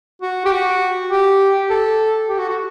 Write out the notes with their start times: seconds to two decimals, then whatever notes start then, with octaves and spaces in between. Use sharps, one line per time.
0.22 F#4
0.46 G4
0.52 F#4
1.11 G4
1.70 A4
2.29 G4
2.39 F#4
2.49 F#4